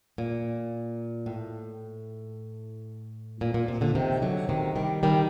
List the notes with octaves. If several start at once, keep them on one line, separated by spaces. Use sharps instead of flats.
A#2
A2
A#2
A#2
C3
A#2 D3
C3 D#3
D3 F#3
C3 D#3
D#3 G3
D#3 G3